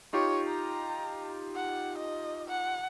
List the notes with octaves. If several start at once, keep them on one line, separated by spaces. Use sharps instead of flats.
D#4 F4 G4 C#5
A#5
F#5
D#5
F#5